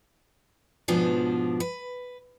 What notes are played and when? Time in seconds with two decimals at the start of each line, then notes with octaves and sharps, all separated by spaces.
0.88 G#2 B2 F3 B3 D4 G#5
1.60 B4